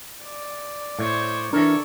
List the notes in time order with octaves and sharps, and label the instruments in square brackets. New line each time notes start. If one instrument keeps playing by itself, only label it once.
[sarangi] D5
[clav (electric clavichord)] A2 [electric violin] C5 C#5
[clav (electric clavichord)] E3 A#4 [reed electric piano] D4 [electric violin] A4 C#5